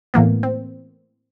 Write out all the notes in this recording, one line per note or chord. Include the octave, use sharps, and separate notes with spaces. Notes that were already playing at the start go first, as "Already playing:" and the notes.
A2 E3 A#3 B3
C4